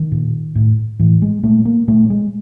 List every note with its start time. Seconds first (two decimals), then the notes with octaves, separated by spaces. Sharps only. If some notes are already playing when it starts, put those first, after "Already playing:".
Already playing: D#3
0.12 A#2
0.55 A2
0.99 A2 E3
1.22 G#3
1.43 A#2 A3
1.65 A#3
1.88 A#2 A3
2.10 G#3